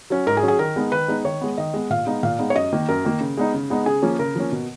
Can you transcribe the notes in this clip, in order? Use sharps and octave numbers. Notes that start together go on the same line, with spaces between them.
F#3 C#4
G#2 A#4
G#4
F#3 C#4
G#4
D#3 A#4
G#3 B3 D#4
D#3 B4
G#3 B3 D#4
D#3 C#5
G#3 B3
D#3 D#5
G#3 B3
A#2 F5
G#3 B3 D#4
A#2 F5
G#3 B3 D#4
C#5
F#2 D#5
D#3 A#3
F#2 A#4
D#3 A#3
C#3
G#3 B3 D#4
C#3
G#3 B3 D#4
C#3 G#4
F3 A#3 C#4
C#3 A#4
F3 A#3 C#4
B2